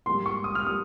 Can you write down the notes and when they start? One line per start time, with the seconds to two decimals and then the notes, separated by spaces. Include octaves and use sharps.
0.06 G#2 G3 A#3 C6
0.26 C#6
0.44 D#6
0.55 F6
0.63 G3 A#3 D#6